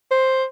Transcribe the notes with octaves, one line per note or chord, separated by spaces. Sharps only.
C5